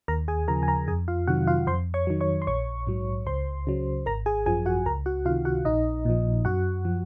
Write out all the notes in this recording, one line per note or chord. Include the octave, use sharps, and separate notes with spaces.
D#2 A#4 A#5
G#4 G#5
C#3 F3 A#4 A#5
G#5
A#4 A#5
F2 G#4 G#5
F4 F5
C3 D#3 F#3 F#4 F#5
F4 F5
F2 C5 C6
C#5 C#6
D#3 F#3
C#5 C#6
C6
A#1 C#5 C#6
G#2 F#3
C#2 C5 C6
C#3 F#3
G#1 A#4 A#5
G#4 G#5
F#2 F3 G#4 G#5
F#4 F#5
C#2 A#4 A#5
F#4 F#5
C3 D#3 F4 F5
F#4 F#5
A#1 D#4 D#5
A#2 F3
F#2 F#4 F#5
F3